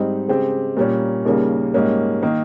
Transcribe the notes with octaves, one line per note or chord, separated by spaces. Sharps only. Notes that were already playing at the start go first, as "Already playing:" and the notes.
Already playing: G#2 G3 C4 D#4
C#3 G#3 C4 G4
A#2 G3 A#3 C#4
D#2 C#3 G3 A#3 C#4
G#2 G3 A#3 C#4
D#3 A#3